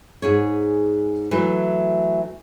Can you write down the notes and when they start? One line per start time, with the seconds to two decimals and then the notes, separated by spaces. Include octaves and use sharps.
0.22 G#2 G#4 C#5
1.31 E3 F#3 A3